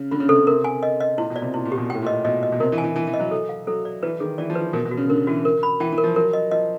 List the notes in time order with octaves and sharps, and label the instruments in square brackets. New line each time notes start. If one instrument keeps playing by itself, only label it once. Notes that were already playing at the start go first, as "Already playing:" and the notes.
Already playing: [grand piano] C#3
[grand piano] D3 [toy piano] F4
[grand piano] C#3
[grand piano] C3 [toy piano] A4
[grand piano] C#3
[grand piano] C3 [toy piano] A#4
[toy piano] G#5
D#5
D#5
[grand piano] A#2 [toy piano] E4
[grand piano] B2
[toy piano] D5
[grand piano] C3
[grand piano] A#2 [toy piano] E4
[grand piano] A#2
[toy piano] G4
[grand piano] B2
A#2
[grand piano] A2 [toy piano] G5
[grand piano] A#2
[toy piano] D#5
[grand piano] B2 [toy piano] D#5
[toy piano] D#5
[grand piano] B2
[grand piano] C3 [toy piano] A#4
[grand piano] E3
[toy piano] G#5
[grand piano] E3
[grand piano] E3 [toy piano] G#5
[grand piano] E3
[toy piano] D#5
[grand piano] F#3
[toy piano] A4
F5
[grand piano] F#3 [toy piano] A4
[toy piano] D5
[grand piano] E3 [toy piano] B4
[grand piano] D#3 [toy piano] G#4
[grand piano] E3 [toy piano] D5
[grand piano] F3
[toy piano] B4
[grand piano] E3
[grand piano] B2 [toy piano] A#4
[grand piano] B2
[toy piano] F#4
[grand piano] C#3
[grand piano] D3 [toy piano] A#4
[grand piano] E3 [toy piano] F#4
[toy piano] A#4
B5
[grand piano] E3 [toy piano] G5
[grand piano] E3
[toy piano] A#4
[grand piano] F3
[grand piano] F#3 [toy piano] A#4
[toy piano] D#5
[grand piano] F3 [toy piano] D#5